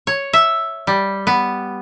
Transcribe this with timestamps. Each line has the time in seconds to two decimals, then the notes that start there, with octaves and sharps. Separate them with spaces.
0.07 C#5
0.33 E5
0.87 G3
1.27 B3